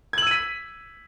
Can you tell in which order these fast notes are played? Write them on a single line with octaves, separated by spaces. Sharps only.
G#6 F#7 E6 D#7 B6